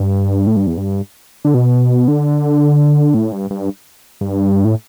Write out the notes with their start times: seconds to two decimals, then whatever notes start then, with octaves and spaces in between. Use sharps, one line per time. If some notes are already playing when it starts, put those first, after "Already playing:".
Already playing: G2
0.47 A2
0.56 G2
0.67 E2
0.78 G2
1.45 D3
1.54 B2
2.08 D3
3.14 A2
3.32 G2
3.51 G2
4.21 G2
4.65 A2